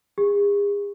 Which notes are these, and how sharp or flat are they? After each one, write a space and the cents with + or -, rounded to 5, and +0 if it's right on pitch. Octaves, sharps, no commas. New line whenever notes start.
G#4 -40